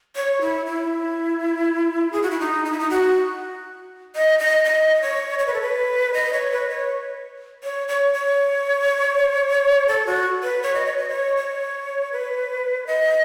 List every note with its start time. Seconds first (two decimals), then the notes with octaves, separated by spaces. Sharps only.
0.16 C#5
0.41 E4
0.66 E4
2.13 G#4
2.23 F#4
2.31 E4
2.40 D#4
2.65 D#4
2.72 E4
2.79 D#4
2.90 F#4
4.15 D#5
4.39 D#5
4.65 D#5
5.02 C#5
5.39 C#5
5.47 B4
5.54 A4
5.62 B4
6.14 D#5
6.33 C#5
6.52 B4
6.70 C#5
7.63 C#5
7.88 C#5
8.14 C#5
9.88 A4
10.06 F#4
10.43 B4
10.63 C#5
10.74 D#5
10.86 C#5
10.98 D#5
11.09 C#5
11.37 C#5
12.12 B4
12.87 D#5